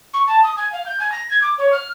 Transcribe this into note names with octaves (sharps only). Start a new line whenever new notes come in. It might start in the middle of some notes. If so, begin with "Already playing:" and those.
C#6
A5
D#6
G#5
F5
G6
G#5
A#6
G#6
D6
C#5
F6